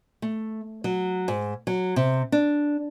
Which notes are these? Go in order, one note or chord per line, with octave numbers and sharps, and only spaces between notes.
A3
F#3
G#2
F#3
C3
D4